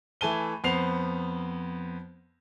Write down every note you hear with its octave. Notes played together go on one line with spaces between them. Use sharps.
E3 A3 G#5 A5 D#7 G7
F2 B3 C5 C7 F7